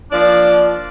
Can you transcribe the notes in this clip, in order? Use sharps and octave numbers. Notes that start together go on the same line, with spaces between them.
F3 A#3 D4 D5